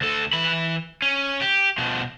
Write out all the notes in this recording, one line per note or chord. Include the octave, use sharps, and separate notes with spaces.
D2 A4
E3 B5
C#4
G4
B2 F3